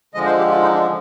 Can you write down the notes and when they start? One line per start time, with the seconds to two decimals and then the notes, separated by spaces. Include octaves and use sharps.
0.14 D3 F3 G#3 D#5
0.26 C5
0.38 G4
0.50 F4
0.62 D#4
0.74 D4